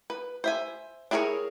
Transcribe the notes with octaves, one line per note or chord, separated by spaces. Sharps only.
B4
C5 E5 G#5
D4 E4 G#4 A#4 C#5